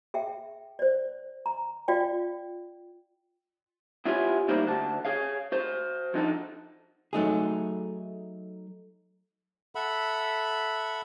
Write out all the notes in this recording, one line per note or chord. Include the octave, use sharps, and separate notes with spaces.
G#4 E5 G5
C5 D5
A#5
F4 D5 F5 G5
B3 E4 F4 G4 C#5 G#5
G3 A3 A#3 D#4 E4 C5
D2 F#4 A5
G#4 C#5 F5
F#4 C5
F3 D4 D#4 F#4 A4
F#3 A3 D#4 G#4
A4 E5 F#5 B5